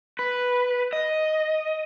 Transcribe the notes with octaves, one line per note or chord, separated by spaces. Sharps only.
B4
D#5